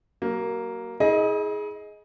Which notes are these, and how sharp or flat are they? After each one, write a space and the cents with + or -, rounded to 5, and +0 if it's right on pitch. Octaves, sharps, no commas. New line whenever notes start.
F#3 +35 A#3 +0
E4 -40 G#4 +10 D#5 +10